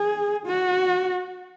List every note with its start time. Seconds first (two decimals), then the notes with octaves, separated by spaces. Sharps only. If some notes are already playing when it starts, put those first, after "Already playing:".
Already playing: G#4
0.47 F#4